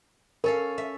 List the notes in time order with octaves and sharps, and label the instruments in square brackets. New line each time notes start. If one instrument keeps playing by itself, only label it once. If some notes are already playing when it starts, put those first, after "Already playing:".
[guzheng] C#4 A4 F5 [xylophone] A#4
[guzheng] E5